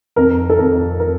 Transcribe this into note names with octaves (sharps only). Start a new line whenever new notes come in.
F2 A#4
A4
F2 A#4
A#4